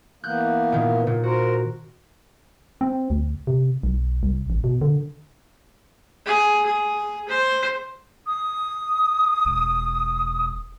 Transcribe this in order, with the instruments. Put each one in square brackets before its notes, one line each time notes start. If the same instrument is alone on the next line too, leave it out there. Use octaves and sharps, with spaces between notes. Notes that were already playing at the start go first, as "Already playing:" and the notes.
[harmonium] E3 A#3 B3 [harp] F#6 G6
[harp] A#2 D#3
A#2
[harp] F#4 [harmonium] A#4 C5
[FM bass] C4
D2
C3
B1
C2
A1
B2
D3
[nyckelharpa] G#4
G#4
C5
[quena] D#6
[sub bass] E1